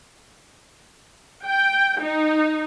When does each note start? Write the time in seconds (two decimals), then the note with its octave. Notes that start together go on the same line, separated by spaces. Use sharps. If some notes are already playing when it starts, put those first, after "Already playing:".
1.45 G5
2.01 D#4